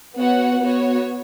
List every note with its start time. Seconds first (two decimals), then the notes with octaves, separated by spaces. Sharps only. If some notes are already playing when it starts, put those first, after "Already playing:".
0.14 B3 F#4 C#5 F#5
0.59 B3 F#4 C#5